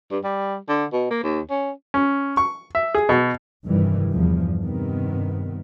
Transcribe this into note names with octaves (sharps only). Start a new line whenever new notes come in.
G2
G3
D3
B2
A#3
D#2
C#4
C#4
C#6
E5
G#4
B2
F1 G2 D#3 E3 G3
E2 G2 F3
G2 C3 D#3 B3